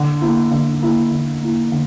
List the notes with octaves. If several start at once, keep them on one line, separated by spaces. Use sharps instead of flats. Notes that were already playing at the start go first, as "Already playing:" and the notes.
Already playing: D3
A#3 E4
D3
A#3 E4
D3
A#3 E4
D3